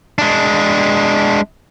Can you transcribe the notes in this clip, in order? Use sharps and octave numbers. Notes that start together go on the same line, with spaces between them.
G#3 D4